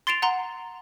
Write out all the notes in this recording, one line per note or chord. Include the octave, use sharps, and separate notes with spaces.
C6 A6 C7 D7 E7 F7
F#5 A#5 C6